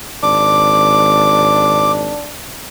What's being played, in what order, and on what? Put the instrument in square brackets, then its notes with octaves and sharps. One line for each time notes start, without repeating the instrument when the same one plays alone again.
[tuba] G#1 [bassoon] D4 [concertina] D6